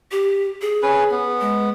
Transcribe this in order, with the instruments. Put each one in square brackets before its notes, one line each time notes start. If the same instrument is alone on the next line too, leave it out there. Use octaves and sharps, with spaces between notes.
[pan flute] G4
G#4
[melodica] C#4 B4
B3
[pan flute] G#3